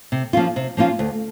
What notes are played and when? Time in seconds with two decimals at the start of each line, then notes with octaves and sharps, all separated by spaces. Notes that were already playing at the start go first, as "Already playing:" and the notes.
0.12 C3
0.33 F3 A#3 C#4 F4
0.56 C3
0.77 F3 A#3 C#4 F4
0.99 D2